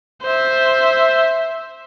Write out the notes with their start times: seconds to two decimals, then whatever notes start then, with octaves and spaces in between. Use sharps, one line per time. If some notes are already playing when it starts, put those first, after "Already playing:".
0.23 C5 E5